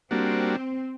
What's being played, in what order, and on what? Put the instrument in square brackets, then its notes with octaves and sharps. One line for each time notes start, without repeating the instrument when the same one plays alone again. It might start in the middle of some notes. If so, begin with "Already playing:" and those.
[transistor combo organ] G3 A#3 D4 F#4 [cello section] C4